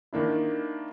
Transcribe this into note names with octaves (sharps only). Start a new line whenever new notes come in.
D#3 A#3 D4 E4